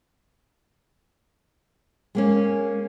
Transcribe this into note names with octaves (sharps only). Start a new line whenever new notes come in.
G#3 A#3 C#4